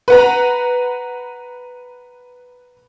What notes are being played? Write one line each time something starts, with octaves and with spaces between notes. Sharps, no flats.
B4 F#5 A#5